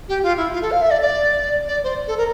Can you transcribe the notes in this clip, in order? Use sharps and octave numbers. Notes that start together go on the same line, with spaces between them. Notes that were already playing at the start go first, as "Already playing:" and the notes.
G4
F4
E4
F4
A4
F5
E5
D5
D5
D5
C5
A4
A#4